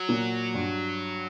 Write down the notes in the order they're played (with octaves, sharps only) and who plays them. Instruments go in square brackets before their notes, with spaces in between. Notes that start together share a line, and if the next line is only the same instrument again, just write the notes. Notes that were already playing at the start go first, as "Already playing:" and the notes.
Already playing: [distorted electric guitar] F#3
[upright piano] A#2
G2